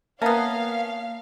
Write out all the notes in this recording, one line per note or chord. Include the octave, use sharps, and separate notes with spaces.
A#3 B3 C#4 E5 F5 A5 A#5